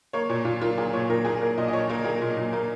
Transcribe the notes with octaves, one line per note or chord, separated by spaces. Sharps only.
A#3 C#5
A#2 C#5
A#2 F4
A#3 F4
A#3 G#4
A#2 C#5
A#2 A#4
A#3 G#4
A#3 A#4
A#2 D#5
D#5
A#2 C#5
A#3 A#4
A#3 G#4
A#2
A#2
A#3